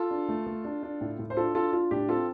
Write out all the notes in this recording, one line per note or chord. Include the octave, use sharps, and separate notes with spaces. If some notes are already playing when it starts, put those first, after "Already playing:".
Already playing: F4 A4
D4
A3
A3
D4
D4
A2
A2
C5
D4 F4 A4
D4 F4 A4
D4 F4
A2 D4 G4
C4 F4 A4